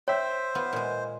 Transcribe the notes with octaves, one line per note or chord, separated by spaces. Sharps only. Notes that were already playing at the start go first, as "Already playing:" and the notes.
C5 C#5 E5 G5
B3 F4
A#2 G#3